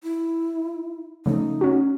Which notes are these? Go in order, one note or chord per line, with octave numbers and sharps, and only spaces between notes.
E4
C#3 F3 A3 D#4
C#4 F#4